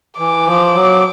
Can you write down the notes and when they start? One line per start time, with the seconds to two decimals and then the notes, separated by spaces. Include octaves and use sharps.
0.18 E3 D6
0.46 F3
0.74 F#3